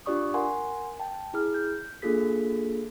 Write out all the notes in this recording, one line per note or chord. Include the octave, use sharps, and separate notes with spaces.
D4 F4 G4 D5 C#6 D#6
A#4 F#5 G#5 C6
G5 A5
E4 G#4 F6
G6
A#3 D4 F4 G#4 A4 B6